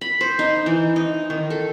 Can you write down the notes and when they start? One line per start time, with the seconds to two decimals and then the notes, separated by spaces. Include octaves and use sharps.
0.01 B5
0.21 C5
0.39 D#4
0.66 E3
0.96 D#4
1.30 D#3
1.50 A4